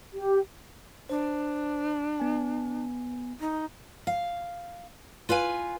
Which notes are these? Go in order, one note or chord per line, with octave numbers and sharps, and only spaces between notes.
G4
D4 C5
B3 G#5
D#4
F5
F4 B4 F5 G#5